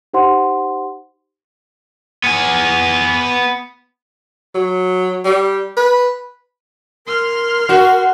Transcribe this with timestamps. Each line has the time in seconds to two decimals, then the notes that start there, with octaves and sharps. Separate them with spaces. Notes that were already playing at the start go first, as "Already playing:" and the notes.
0.13 D#4 G4 C5 F#5 C6
2.24 B3 G#5
4.55 F#3
5.25 G3
5.77 B4
7.07 A#4 C6 F6
7.69 F#4